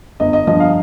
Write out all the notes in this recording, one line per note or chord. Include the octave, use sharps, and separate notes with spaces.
G1 D#5
D#5
G2 F3 D#5
F5